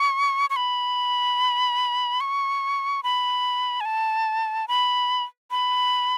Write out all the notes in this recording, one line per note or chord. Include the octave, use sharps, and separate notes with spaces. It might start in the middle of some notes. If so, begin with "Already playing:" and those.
Already playing: C#6
C#6
B5
C#6
B5
G#5
A5
B5
B5